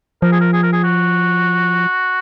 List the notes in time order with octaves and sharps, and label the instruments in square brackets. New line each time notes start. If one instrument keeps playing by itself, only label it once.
[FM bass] F3 [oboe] A#4
[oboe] G#4
A#4
G#4
A#4
G#4
F#4